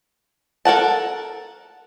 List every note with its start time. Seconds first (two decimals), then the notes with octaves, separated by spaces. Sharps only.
0.65 A4 A#4 F#5 A5